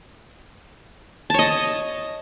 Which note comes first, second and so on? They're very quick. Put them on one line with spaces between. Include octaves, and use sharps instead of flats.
A5 C#5 D#5